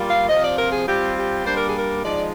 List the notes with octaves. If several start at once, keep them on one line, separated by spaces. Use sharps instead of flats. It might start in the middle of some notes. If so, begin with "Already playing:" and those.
Already playing: G3 A#3 F4
F5
C3 F3 C4 F4 D#5
D5
A#4
G#4
G3 C4 F4 G4
G4
G3 A#3 D4 C5
A#4
G#4
A#4
F3 G#3 D#4 D5